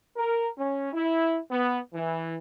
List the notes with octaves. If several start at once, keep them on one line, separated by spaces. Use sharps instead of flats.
A#4
C#4
E4
B3
E3